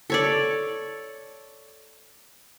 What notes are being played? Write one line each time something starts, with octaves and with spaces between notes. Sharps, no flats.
A4 C#5 D5